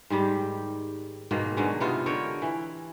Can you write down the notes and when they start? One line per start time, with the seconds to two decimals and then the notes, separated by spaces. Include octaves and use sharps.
0.10 G#2 D#3 G3 G4
1.31 G#2 B2 D#3 A#3
1.57 B2 D3 F#3 G#3
1.81 C3 B3 D#4 F4
2.06 D3 A#4 C#5 G5
2.42 E3